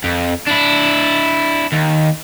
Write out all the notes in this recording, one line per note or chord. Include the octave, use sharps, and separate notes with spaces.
F2
D4 E4
D#2